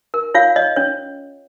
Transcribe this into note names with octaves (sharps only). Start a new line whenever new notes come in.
A#4
F4 C#5 F5
C#5 D#5
C#4 C#5